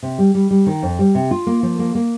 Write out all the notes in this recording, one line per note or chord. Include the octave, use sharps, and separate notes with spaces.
C3
G3
G3
G3
D#3
F2
G3
C3
F4
A#3
F3
A#3
A#3